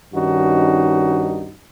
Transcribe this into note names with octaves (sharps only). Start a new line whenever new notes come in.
G2 D#3 C#4 D#4 F#4